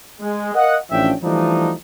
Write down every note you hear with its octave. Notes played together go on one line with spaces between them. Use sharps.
G#3
A#4 D#5 F5 F#5
A1 F3 C#4 D4 E5 G5
E3 F3 G3 A3 D4 D#4